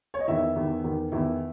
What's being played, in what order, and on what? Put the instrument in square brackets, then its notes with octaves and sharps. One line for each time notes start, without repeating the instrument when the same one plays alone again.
[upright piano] C#5
D#5
E2 D#3 E4 E5
E2 D#3
E2 D#3
E2 D#3 E4 E5